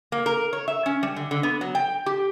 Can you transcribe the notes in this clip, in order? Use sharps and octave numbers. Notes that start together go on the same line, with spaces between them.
A#3
A#4
C#5
E5
C#4
G3
D3
D3
B3
F#3
G5
G4